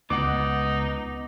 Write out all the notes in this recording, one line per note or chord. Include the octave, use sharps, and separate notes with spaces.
C#2 B3 D#4 F#5 D6